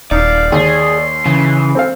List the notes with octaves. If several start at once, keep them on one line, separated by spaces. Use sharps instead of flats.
D#1 D#4 D5 F5
D#2 G#4 C6
C#3 E3
C4 A4 F5